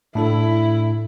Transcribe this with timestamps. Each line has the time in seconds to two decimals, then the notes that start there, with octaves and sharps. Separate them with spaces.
0.15 A2 D4 E4 A4